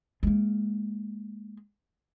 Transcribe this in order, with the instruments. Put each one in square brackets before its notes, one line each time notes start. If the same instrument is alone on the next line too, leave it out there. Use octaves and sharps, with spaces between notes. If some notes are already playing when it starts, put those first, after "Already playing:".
[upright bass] G#3 A#3